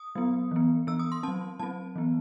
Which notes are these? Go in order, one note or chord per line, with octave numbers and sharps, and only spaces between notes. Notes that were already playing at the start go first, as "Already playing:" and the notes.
Already playing: D#6
F#3 B3
E3 B3
E3 B3 E6
D#6
C6
F#3 C4 A5
F#3 C4 A5
E3 B3